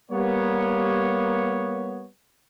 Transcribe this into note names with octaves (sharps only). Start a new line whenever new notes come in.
G3 A#3 B3 C#5